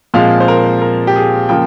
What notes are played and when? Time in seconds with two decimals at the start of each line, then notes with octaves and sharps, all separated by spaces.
0.14 A#2 F3 G#3 C4 F5
0.40 C5
0.48 A#4
0.65 C5
0.82 A#4
1.07 G4
1.16 G#4
1.49 C#3 F3 A#3 G5